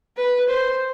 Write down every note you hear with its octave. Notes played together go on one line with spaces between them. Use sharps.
B4
C5